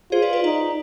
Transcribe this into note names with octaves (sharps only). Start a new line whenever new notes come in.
F4 G#4 C5
B4 D5
B4 D5
D#4 B4 D5